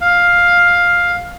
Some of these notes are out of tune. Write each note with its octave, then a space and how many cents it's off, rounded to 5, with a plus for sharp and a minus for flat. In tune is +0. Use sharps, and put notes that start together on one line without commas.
F5 +10